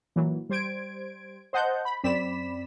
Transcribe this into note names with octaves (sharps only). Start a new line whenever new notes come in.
A#2 E3 F#3
G3 C5 G#6 D7
C5 D#5 F#5 A5 G6
B5
F#2 C4 D5 B5 B6 E7